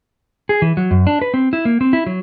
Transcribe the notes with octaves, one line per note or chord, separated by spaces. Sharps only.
G#4
E3
F#3
F#2
D4
B4
C4
E4
A#3
C4
E4
F#3